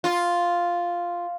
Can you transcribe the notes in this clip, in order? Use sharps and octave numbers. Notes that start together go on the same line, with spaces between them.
F4